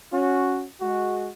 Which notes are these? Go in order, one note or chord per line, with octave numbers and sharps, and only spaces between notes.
C#4 F#4
G#3 F#4